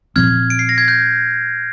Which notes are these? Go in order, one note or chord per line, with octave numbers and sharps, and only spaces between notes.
A#2 F3 C4 F6 G#6
D7
C7
A#6
G#6
G6